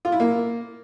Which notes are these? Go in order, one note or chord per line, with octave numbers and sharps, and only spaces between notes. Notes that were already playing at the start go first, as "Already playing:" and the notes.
F4
E4
A#3